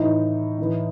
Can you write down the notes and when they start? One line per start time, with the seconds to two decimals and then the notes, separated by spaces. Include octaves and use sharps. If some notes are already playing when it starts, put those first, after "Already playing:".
Already playing: A2 E3 D#4
0.58 A2 E3